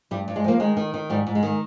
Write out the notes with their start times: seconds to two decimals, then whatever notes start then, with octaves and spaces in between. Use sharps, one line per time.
0.11 G2 G3
0.28 G2
0.36 G#3
0.44 F3 A#3
0.60 D#3 G#3
0.77 D#3
0.94 D#3
1.10 G#2 G3
1.27 G#2
1.35 G#3
1.43 D#3